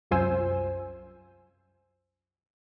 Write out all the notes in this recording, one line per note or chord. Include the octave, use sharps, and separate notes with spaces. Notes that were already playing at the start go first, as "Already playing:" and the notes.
C2 F#2 F4 C5 G#5 E6